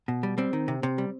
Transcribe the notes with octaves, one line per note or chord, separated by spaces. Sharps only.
B2
G3
G3 C4
D#3
C3
C3
G3